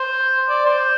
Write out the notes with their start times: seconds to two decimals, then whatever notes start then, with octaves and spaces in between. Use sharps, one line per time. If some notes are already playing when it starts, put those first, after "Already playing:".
Already playing: C5
0.49 D5
0.66 C5